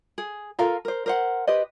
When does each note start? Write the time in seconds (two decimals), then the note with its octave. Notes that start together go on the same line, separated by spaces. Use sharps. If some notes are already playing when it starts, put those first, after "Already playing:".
0.18 G#4
0.59 F4 A4 A#4 F5
0.85 A#4 C5
1.06 A#4 C5 F#5
1.47 G4 B4 C5 D#5